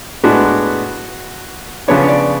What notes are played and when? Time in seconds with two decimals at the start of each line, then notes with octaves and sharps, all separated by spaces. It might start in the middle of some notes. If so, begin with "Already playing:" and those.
0.24 A2 G#3 B3 D4 F#4
1.88 C#3 F3 B3 D4 C#5
2.08 D5